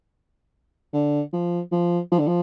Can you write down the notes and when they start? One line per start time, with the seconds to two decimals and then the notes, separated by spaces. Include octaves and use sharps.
0.93 D3
1.33 F3
1.72 F3
2.12 F3
2.19 D3
2.27 F3